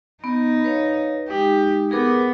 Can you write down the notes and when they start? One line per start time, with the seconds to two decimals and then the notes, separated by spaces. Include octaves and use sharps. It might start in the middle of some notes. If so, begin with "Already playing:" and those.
0.24 B3 D#4
0.64 B4 C#5 F5
1.29 G#3 D#4 G4
1.91 B3 G#4 A#4 D6